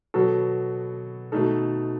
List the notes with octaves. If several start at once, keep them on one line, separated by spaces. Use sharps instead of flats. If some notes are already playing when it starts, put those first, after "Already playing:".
B2 F#3 B3 F#4 A4
B2 A3 D#4 A4